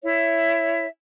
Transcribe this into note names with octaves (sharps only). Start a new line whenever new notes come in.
E4 C#5 E5